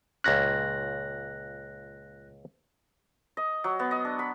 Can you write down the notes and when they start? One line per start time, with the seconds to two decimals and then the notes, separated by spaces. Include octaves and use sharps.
0.24 C#2 A#2 C#4 F#6 A#6
3.37 D#5
3.64 F#3
3.79 B3
3.91 D#5
4.05 D4
4.19 B5